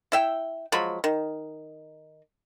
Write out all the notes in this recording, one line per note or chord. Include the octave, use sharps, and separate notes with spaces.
E4 E5 G5
F3 F#3 G#3 B5
D#3